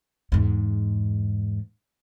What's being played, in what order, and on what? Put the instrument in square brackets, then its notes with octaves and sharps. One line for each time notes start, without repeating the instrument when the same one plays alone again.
[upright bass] E2 G#2